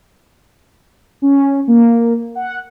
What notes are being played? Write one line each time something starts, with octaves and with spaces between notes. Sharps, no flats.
C#4
A#3
F#5